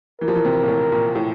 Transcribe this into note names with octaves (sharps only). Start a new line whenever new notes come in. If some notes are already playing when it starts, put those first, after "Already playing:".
E3 A#4
F3
E3
C3
A#2
A2
A#2
A2